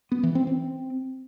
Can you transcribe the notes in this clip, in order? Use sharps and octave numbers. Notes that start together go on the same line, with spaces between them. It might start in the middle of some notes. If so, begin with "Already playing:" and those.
B3
E3
C4
C4